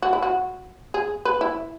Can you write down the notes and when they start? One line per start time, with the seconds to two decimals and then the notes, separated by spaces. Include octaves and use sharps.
0.02 F#4
0.13 E4
0.22 F#4
0.94 G#4
1.25 B4
1.41 E4